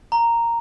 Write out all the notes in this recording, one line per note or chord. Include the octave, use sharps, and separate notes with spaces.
A#5